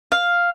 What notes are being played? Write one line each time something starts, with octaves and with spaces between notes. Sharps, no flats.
F5